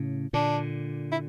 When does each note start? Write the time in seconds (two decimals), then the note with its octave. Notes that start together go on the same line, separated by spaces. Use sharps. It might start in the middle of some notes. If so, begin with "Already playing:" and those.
Already playing: A2 C#3
0.33 A#2 D3 D4
1.12 E4